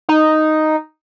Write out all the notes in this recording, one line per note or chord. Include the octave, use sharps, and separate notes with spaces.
D#4